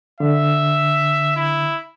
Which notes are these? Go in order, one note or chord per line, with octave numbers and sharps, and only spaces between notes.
D3 E5
E4